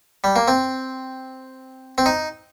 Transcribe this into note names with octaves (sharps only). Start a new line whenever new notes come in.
G3
A#3
C4
C4
D#4